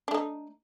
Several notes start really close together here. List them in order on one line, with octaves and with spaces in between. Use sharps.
D4 A3 D#4